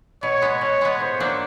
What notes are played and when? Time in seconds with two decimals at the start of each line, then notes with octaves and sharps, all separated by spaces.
0.23 B2 C#5
0.42 G#3 B3
0.61 B2 C#5
0.81 G#3 B3
1.00 A2 C5
1.20 F#3 A#3 D4